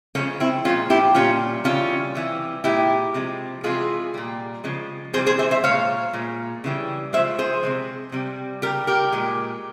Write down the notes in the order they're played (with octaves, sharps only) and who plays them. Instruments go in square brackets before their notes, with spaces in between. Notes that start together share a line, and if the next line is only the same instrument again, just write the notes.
[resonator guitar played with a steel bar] C#3 F3 G#3 A#3 C#4
C4 E4
G#3 C#4 F4
A#2 F3
E4 G4
A#2 G3 C#4 F4
C#3 E3 G3 C#4 F4
C3 E3 G3
A#2 G#3 E4 G4
C3 F3 G#3
C3 E3 G#3 F4 G#4
A#2 G3
C#3 F3 G#3
C3 E3 G3 G#4 C5
G#4 C5
C5 E5
C5 E5
A#2 G#3 C#5 F5
A#2 G#3
C#3 E3 G3
C#3 F3 G#3 C5 E5
G#4 C5
C3 F3 G#3
C3 G3
C#3 G3 G4 A#4
G4 A#4
A#2 G#3